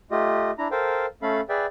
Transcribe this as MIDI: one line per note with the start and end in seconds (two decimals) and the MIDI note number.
0.11 0.51 57
0.11 0.51 65
0.11 0.51 67
0.11 0.51 75
0.58 0.68 62
0.58 0.68 64
0.58 0.68 82
0.71 1.06 69
0.71 1.06 70
0.71 1.06 72
0.71 1.06 77
0.71 1.06 79
1.22 1.41 57
1.22 1.41 61
1.22 1.41 69
1.22 1.41 77
1.22 1.41 83
1.49 1.66 68
1.49 1.66 71
1.49 1.66 74
1.49 1.66 76
1.49 1.66 79